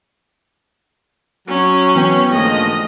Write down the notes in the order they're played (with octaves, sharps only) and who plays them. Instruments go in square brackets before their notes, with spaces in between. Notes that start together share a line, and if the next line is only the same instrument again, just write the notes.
[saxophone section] F#3 [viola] C#4
[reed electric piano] E3 B3 G5
[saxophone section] G#2 D3 F3 [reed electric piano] A3 A#3 [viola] D#5